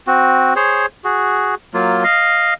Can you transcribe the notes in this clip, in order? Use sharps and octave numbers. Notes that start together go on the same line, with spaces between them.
C4 F#4
G#4 C5 C#5
F#4 G#4
F#3 A#3 F4
D#5 F5